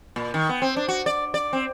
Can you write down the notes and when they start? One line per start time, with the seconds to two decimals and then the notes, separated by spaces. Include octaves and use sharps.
0.16 A#2
0.34 D#3
0.49 B3
0.62 C4
0.77 D4
0.88 F#4
1.06 D5
1.34 D5
1.53 C4